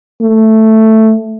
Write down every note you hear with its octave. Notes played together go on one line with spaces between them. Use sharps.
A3